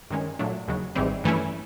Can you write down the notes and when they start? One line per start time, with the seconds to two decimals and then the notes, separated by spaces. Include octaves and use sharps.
0.10 G2 D#3 G#3 C#4
0.39 A#2 F#3 A3 D4
0.68 D#2 C#3 F#3
0.95 G#1 G#2 E3 G3 C4
1.24 G2 E3 A3 C#4 E4